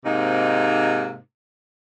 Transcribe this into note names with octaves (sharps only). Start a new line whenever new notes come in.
G#2 C3 A#3 D#4